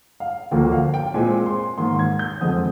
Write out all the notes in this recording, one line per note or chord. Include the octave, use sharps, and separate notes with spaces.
F5
D2 D3 F3 A#3 G5
F5
G5
A#2 G#3 C4 G#5
C6
G#2 D#3 A#3 C6
G#6
G6
F2 D3 G#3 C4 D#6